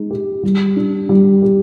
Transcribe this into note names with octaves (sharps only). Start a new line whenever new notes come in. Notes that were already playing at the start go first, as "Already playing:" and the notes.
Already playing: G#3 D#4
G4
G3
D4
G3
G4